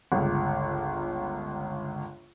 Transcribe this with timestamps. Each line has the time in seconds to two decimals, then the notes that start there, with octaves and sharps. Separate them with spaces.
0.12 G1 C#2